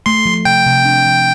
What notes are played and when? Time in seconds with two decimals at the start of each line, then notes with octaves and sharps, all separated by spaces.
0.06 A3 C6
0.26 F3
0.45 C3 G5
0.66 C3
0.85 D4
1.06 F3